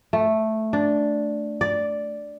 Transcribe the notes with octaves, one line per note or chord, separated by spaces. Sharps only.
A3
D4
D5